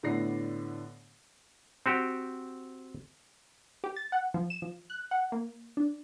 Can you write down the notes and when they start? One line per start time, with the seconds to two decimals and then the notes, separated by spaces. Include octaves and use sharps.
0.03 A2 D3 B3 D5 A#6 C7
1.86 C4 F#4 G4
3.84 G4
3.96 A6
4.12 F#5
4.34 F3
4.50 E7
4.62 F3
4.90 F#6
5.11 F#5
5.32 A#3
5.77 D4